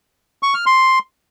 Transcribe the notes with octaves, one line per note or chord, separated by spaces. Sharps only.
C#6
F6
C6